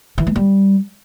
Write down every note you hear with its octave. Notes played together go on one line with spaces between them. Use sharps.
E3
G#3
G3